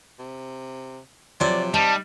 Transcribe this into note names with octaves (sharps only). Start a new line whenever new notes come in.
C3
C3 F3 F#3 D5
G3 D#4 A5